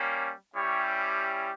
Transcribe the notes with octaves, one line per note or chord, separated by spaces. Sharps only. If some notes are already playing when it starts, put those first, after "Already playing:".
Already playing: G3 A#3 C#4
G3 C#4 E4 G4 C#5